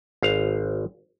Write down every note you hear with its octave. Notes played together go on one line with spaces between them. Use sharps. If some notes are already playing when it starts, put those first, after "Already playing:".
G#1 F5